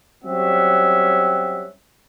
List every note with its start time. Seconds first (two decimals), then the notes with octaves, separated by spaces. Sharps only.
0.24 F#3 G3 C4 C#4 E5 F#5